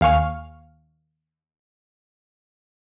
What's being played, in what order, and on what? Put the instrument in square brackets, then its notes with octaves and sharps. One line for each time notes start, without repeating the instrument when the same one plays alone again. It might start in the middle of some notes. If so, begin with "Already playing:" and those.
[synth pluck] D#2 F5 G#5 C#6 F6